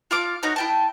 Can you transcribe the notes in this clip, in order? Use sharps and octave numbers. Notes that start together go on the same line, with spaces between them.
F4 F5 D6
B3 D#4 F#4 C#5
E4 G5 A5